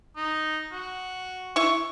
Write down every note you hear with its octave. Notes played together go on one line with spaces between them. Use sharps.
D#4
F#4
E4 C#6